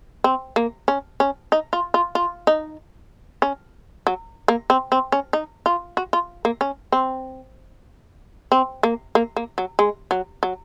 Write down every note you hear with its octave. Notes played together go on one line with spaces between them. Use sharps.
C4
A#3
C#4
C#4
D#4
F4
F4
F4
D#4
C#4
F#3
A#3
C4
C4
C#4
D#4
F4
F#4
F4
A#3
C#4
C4
C4
A#3
A#3
A#3
F#3
G#3
F#3
F#3